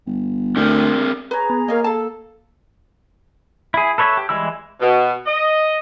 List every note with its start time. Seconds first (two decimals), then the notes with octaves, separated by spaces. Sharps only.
0.06 G1
0.56 D2 D3 C4 A#4
1.31 G#4 B4 C#5 A#5
1.50 B3
1.68 A#3 A#4 C#5 D#5 F5
1.84 A4 F5 A5
3.74 E4 G#4
3.98 A4 B4 C#5 D#5 E5
4.17 G4
4.29 E3 G3 G#3 E4 E6
4.80 B2
5.26 D#5